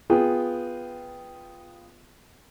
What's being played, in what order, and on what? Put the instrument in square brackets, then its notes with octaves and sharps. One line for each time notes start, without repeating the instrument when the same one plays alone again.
[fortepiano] B3 F4 G#4 G5